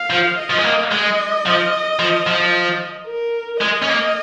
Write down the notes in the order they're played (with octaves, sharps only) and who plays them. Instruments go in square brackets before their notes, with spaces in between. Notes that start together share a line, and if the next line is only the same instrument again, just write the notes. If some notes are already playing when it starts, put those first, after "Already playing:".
Already playing: [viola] F5
[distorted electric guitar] F3
[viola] D#5
[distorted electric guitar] F3
G#3
A#3
[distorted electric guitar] G#3 [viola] D#5
[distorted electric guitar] F3
F3
F3
[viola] A#4
[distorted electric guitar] G#3 [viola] D#5
[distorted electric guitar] C#4
A#3